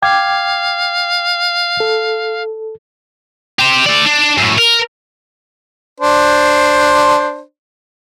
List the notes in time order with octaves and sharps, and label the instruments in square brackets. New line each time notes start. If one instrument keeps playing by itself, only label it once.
[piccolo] F5 [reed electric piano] G5 D6 G#6
[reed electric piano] A4
[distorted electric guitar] G4 C5
A3 D5
D4
F#2 A2
A#4
[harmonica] D4 C5